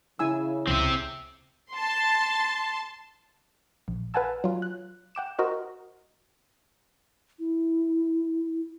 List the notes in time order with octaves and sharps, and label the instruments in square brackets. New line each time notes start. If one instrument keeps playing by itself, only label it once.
[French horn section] C#3 [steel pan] E4 G#5 E6
[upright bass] C#2 C3 [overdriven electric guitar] C4 E5
[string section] A5 C6
[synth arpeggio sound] A#1
B4 F5 F#5 G#5 A5 E6
F#3 F4
F#6
F#5 G5 D6 E7
F#4 A#4 C5 D#5 F#5
[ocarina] E4